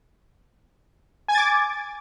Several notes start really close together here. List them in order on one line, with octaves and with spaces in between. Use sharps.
G#5 G#6 A6 D6